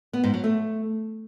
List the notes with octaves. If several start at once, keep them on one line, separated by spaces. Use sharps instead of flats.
B3
G#2
F#3
A3